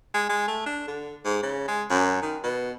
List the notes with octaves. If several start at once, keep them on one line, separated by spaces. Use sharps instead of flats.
G#3
G#3
A3
D4
D3
G#2
C#3
G#3
F#2
D#3
B2